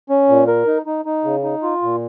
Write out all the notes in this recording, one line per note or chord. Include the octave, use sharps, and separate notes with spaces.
C#4
A#2
A#4
D#4
D#4
D#4
C#3
D#4
F4
A#2